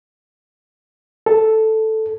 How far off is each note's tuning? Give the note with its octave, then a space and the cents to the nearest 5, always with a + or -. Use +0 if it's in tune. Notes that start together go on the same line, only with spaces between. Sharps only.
A4 +0